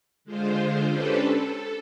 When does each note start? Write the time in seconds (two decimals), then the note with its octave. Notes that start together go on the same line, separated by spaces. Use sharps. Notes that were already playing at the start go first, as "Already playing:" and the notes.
0.25 D3 G#3 F4 C5
0.88 C#4 D4 G4 A4 B4 C5
1.22 A4